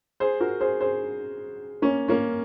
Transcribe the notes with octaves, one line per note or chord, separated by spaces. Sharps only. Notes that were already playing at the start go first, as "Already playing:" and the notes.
G#4 C5
F#4 A#4
G#4 C5
G#4 C5
A#3 C#4
A#3 C#4